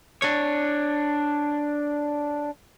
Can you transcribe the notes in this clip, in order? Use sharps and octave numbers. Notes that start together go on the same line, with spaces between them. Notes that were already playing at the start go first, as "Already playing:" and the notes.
D4 C#5